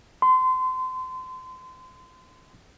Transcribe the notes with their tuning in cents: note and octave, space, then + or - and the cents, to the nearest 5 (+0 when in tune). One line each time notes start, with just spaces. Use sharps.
C6 -30